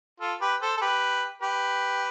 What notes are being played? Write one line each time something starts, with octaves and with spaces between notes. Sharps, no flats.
F4 A4
G4 B4
A4 C5
A4
G4 B4
G4 B4